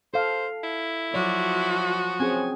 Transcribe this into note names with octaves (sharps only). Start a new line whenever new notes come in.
A4 C5 F5
E4
F3 F#3 F#4 C#5 D5
C4 C#4 G#4 G#5